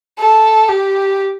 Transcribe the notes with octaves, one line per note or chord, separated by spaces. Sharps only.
A4
G4